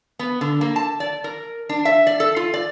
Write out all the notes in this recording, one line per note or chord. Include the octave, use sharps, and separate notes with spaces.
B3
D3
A#3
A5
D5
A#4
D4
E5
D5
A4
F4
D5